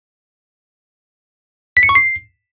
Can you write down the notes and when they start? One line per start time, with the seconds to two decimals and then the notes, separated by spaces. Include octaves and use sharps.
1.77 B6
1.83 C#7
1.89 C#6
1.95 C7